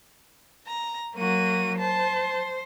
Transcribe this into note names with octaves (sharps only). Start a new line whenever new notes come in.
A#5
F#3 A#3 F#4 D#7
C5 A5